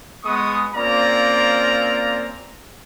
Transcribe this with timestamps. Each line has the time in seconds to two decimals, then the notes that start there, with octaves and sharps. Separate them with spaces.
0.24 G#3 B3 G#4 C#6 D#6
0.75 A#3 C4 C#4 F4 D5 A#5